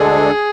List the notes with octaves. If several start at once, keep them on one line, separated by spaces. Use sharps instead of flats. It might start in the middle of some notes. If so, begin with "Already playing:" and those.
Already playing: D2 D3 G#3 D4 G#4 A4